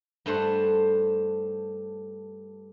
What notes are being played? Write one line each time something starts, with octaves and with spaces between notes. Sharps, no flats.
G2 A3 C5 F#5